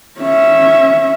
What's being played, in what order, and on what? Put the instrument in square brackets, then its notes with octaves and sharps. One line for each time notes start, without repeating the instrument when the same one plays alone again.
[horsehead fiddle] C#4 E5